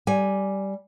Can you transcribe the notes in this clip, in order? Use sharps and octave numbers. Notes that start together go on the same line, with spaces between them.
G3 G#5